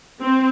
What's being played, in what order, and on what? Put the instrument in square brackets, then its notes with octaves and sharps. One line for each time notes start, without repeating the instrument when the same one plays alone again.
[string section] C4